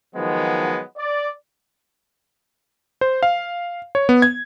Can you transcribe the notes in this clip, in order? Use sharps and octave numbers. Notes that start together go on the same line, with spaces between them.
D#3 F3 F#3 G#3 B3
D5
C5
F5
C#5
B3
G#6